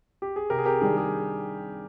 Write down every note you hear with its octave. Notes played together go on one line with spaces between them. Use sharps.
G4
G#4
C3 G4 A#4
G#4
G4 A#4
D#3 G3 D4 G#4
G#4